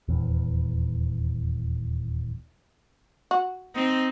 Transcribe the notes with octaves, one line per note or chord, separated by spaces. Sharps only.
D#1 E2
F#4
C4 D#4